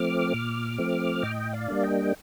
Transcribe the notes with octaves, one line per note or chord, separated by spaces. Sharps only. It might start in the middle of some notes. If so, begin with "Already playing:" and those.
Already playing: F3 A3 C4 D6 F6
A#2
F3 A3 C4
A2 D#5 G5
D5 F5
G3 A#3 D4
D#5 G5